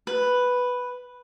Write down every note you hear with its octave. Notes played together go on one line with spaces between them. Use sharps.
B4